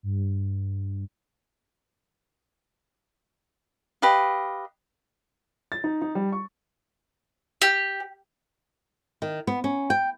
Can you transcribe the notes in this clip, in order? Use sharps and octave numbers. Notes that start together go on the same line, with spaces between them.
G2
G4 B4 D#5 F5
A6
D#4
D#4
G3
C#6
G4
D#3
B3
C#4
G5